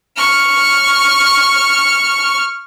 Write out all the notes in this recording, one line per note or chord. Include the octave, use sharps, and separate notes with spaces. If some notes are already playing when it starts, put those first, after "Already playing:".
C#6 F6